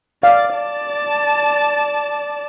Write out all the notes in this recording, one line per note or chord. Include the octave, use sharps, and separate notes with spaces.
D5 F5
D5 A5